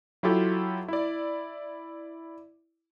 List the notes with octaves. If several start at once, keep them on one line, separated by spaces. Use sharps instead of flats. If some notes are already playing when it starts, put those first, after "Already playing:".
F#3 E4 F4 G4 A4
E4 D5